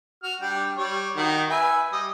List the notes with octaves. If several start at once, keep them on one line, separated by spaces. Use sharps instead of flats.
F#4 F6
G3 D4 G5
G3 C#5
D#3 F#4
B4 E5 G#5
G3 D#5